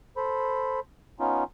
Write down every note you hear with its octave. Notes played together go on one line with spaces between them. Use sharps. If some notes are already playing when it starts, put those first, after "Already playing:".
A4 C5 B5
B3 C#4 D#4 F4